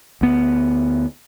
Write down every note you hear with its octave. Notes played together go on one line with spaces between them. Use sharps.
D2 B3